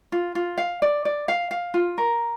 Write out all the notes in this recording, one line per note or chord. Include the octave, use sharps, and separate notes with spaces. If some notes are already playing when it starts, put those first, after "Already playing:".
F4
F4
F5
D5
D5
F5
F5
F4
A#4